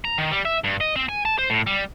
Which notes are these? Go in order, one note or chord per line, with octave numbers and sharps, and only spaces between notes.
A#5
D#3
G3
E5
G2
D#5
C4
G#5
A5
C5
A2
G3